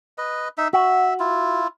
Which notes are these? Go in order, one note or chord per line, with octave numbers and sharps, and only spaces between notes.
B4 D#5
D#4 E5
F#4 E5
E4 F4